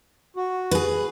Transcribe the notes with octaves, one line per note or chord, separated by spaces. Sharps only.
F#4
G#4 B4